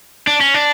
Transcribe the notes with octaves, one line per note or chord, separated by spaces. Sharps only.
D4
C#4
D4